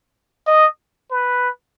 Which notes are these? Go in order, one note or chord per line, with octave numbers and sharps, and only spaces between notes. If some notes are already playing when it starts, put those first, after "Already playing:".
D#5
B4